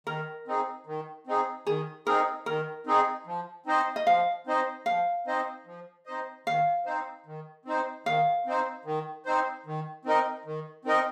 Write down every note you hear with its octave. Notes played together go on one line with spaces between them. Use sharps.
D#3 A#4
C4 D#4 G#4
D#3
C4 D#4 G#4
D#3 G#4
C4 D#4 G#4 A#4
D#3 A#4
C4 D#4 G#4
F3
C4 D#4 C5 D#5
D#5
F3 F5
C4 D#4 C5 D#5
F3 F5
C4 D#4 C5 D#5
F3
C4 D#4 C5 D#5
D#3 F5
C4 D#4 C5
D#3
C4 D#4 C5
D#3 F5
C4 D#4 C5
D#3
C4 D#4 C5
D#3
C4 D#4 A#4 D#5
D#3
C4 D#4 A#4 D#5